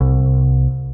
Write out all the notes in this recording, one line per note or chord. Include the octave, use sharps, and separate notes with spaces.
C2